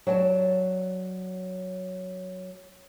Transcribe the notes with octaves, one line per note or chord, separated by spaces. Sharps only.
F#3 D5 G5 A5